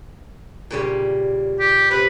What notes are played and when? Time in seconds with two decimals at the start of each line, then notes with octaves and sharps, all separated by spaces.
0.71 A#2 C#3 G3
1.60 G4
1.91 C3 B4